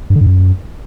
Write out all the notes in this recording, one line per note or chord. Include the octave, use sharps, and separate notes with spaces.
G2
D3
G2
F#2